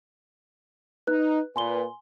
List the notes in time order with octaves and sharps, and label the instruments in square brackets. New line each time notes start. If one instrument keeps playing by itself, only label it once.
[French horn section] D#4 [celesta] B4 F#6
[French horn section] A#2 B4 [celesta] G#5 C6 G7